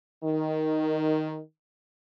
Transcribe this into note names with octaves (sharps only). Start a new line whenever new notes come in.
D#3